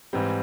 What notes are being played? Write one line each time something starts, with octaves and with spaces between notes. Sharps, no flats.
G#2 E3 G3 C4